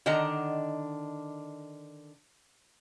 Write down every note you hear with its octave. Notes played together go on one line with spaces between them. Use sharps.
D3 D#3 D4 D#5 F#5 A#5